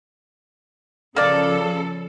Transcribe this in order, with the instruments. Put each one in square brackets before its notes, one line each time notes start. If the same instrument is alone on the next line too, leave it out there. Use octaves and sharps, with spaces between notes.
[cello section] C#3 F3 A4 [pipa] A#3 D5